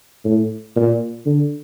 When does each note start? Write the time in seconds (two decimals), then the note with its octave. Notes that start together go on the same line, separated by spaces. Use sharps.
0.25 A2
0.76 A#2
1.26 D3